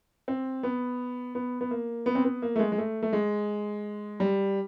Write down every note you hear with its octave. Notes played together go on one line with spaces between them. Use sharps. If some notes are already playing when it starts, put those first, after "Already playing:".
C4
B3
B3
B3
A#3
B3
C4
B3
A#3
A3
G#3
G#3
A3
A3
G#3
G3